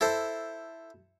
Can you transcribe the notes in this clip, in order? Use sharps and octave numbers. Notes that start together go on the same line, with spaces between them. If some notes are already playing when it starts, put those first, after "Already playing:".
E4 A4 C5